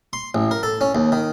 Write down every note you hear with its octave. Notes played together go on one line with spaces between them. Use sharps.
C6
A1
A#4
A4
C#4
D#2
D#3